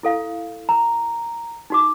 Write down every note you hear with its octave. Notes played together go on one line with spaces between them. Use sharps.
E4 A4 F5
A#5
D#4 F#4 D6